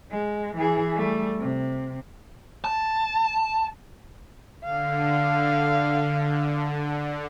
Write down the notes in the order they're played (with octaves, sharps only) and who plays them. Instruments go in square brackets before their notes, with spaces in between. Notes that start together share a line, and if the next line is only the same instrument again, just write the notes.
[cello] G#3
E3 G#4
G3 A3
C3
[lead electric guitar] A5
[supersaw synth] D3 [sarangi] F5